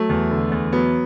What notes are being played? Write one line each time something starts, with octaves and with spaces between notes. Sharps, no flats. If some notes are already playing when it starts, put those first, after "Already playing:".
Already playing: F#3 A3
E2
D3
E2
F#3 B3